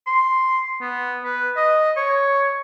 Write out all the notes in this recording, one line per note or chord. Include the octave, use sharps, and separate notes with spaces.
C6
B3
B4
D#5
C#5